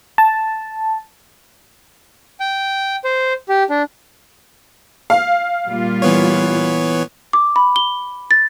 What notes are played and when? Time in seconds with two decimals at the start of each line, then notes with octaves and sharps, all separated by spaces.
0.18 A5
2.40 G5
3.04 C5
3.49 G4
3.70 D4
5.10 F5
5.67 A#2 G3 F4
6.02 E3 B3 C#5
7.33 D6
7.56 B5
7.76 G7
8.31 A6